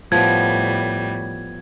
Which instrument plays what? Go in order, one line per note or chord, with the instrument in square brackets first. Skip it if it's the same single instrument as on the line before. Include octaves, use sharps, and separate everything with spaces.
[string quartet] A2 G3 [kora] F3 B3 [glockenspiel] G#6